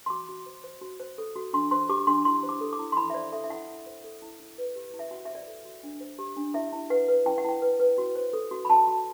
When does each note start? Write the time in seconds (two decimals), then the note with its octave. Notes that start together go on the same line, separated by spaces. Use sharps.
0.06 C6
0.10 F#4 D6
0.29 F#4
0.46 C5
0.64 C5
0.81 F#4
1.00 C5
1.18 A4
1.36 F#4
1.53 D4 C6
1.71 C5 C6
1.89 G4 D6
2.07 D4 C6
2.25 E4 C6
2.43 C5
2.49 D6
2.61 A4
2.73 D6
2.79 E4
2.92 C6
2.97 E4 B5
3.10 E5
3.14 C5 D5
3.32 A4 E5
3.44 E5
3.50 E4 F#5
3.68 E4
3.86 C5
4.04 A4
4.22 E4
4.40 E4
4.58 B4
4.76 G4
4.93 E4
4.99 E5
5.11 F#4 F#5
5.25 C5 E5
5.35 D5
5.47 A4
5.65 F#4
5.83 D4
6.01 C5
6.19 G4
6.37 D4
6.54 E4 E5
6.73 E4
6.90 B4 F#5
7.08 B4
7.26 E4 G5
7.38 F#5
7.44 E4 G5
7.62 B4
7.80 B4
7.98 F#4
8.16 C5
8.33 A4
8.51 F#4
8.65 B5
8.69 F#4 A5
8.87 F#4